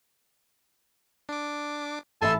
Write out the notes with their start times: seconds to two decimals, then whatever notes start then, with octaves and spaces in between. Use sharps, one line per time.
1.29 D4 D6
2.22 A1 A4 E5 G#5 A5 B5 C6 E6